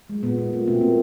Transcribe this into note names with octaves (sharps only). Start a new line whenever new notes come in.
G#3
A#2 B3
A#2
A3
B2 C4
A#3